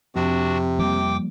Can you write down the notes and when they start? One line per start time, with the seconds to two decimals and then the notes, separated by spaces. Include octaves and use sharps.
0.16 F2 C3 D4 F#4
0.79 F3 G3 A#3 G5 D6